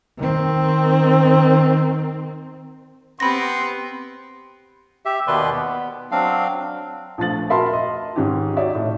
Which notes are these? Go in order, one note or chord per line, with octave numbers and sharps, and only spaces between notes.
D#3 C4
B3 C4 G4 B5 C6 A#6
G4 E5
D#2 B2 D#3 B4 D5 C6
B3
F#3 C4 D4 F5
A#1 F3 A3 A6 F#7
F#4 A#4 E5 A5 B5 C6
D#5
G#2 D#3 C#4 F4 G4
D#4 F#4 C#5 D5 E5
A2